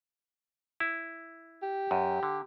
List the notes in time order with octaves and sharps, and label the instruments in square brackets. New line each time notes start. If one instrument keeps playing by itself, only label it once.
[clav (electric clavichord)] E4
[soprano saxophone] G4
[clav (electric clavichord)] F#2
D3